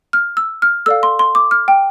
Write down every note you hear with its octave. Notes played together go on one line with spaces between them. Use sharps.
F6
E6
F6
A4 D5 F5 E6
C6
C6
D6
F6
G5